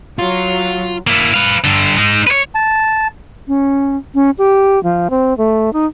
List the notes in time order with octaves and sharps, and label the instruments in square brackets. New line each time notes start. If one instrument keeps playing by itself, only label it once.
[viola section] F#3 [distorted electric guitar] F4
[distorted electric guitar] A#3 E4
B4 F5
G2 D3
G#3 D#4
B4 C#5
[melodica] A5
[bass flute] C#4
C#4
G4
F3
C4
A3
D#4